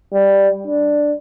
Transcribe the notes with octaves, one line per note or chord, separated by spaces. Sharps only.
G3
D4